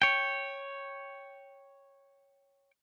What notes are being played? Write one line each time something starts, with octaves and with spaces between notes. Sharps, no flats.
C#5 G5